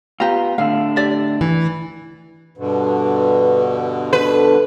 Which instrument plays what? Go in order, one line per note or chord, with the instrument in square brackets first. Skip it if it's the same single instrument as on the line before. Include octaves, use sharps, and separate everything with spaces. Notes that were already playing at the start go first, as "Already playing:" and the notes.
[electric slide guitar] B3 F4 [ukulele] G4 A#5
[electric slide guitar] A2 D3 D4 [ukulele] F5
[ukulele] G4 D5 E5
[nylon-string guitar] E3
[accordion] G2 B2 D3 [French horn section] B4
[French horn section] A4 [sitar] B4